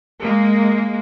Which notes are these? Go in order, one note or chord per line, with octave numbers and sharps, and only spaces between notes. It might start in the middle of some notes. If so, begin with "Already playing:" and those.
G#3 A#3